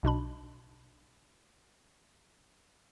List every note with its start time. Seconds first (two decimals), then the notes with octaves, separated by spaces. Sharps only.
0.03 B1 B2 D4 B5